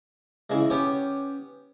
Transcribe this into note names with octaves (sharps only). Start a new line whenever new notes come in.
C#3 E3 G#3
B3 C#4 G4 C#5